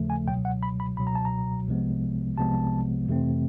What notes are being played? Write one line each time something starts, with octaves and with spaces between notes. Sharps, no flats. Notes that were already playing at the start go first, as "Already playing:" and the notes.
Already playing: D#2 C#3 F3 A3
G#5
C#2 B2 F#3 G5
F#5
B5
B5
C#2 B2 F#3 B5
A#5
A5
A#5
C2 C3 F3 G#3 B3
C2 C3 F3 G#3 B3 A5
F2 C3 E3 A3 C4